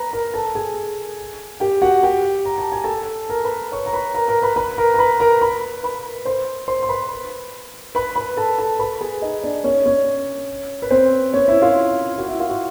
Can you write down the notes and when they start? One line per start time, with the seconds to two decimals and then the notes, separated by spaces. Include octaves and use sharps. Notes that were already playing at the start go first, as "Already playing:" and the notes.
Already playing: B4 A#5 B5
0.13 A#4 A#5
0.34 A4 A5
0.55 G#4 G#5
1.60 G4 G5
1.82 F#4 F#5
2.03 G4 G5
2.46 A#5
2.58 A5
2.72 G#5
2.84 A4 A5
3.30 A#4 A#5
3.44 B4 B5
3.72 C#5 C#6
3.86 A#5
3.93 B4 B5
4.15 A#4 A#5
4.28 A#4 A#5
4.42 B4 B5
4.56 B4 B5
4.78 A#4 A#5
4.94 A#5
4.99 B4 B5
5.20 A#4 A#5
5.41 B4 B5
5.83 B4 B5
6.25 C5 C6
6.68 C5 C6
6.83 C6
6.89 B4 B5
7.95 B4 B5
8.16 B4 B5
8.37 A4 A5
8.58 A4 A5
8.79 B4 B5
9.01 G#4 G#5
9.22 D#4 D#5
9.43 D4 D5
9.64 C#4 C#5
9.86 C#4 C#5
10.82 B4
10.91 C4 C5
11.33 C#4 C#5
11.48 E4 E5
11.62 F4 F5
12.18 F#4 F#5
12.28 E4 E5
12.39 F4 F5
12.50 F#4 F#5